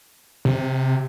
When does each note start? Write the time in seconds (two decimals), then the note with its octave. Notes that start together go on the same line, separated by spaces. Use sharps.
0.45 C3